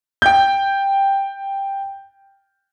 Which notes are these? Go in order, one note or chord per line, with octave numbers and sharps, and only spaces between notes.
G5 G6